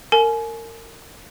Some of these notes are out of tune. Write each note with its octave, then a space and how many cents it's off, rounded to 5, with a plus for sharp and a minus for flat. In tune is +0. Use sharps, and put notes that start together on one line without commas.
A#4 -30 G#5 +35